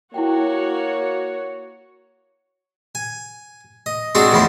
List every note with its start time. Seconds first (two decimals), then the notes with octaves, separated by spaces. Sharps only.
0.14 A#3 E4 F#4 C#5 F#5 G5
2.95 G#5
3.86 D#5
4.15 G#3 C4 D4 D#4 F#4 G#4
4.32 E2 A2 C#3 E3 F3 C6